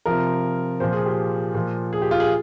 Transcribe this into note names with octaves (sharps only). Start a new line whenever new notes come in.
C3 F3 A#4
A#2 F3 C5
G#4
G4
A#2 F3
G#4
G4
F4
G#4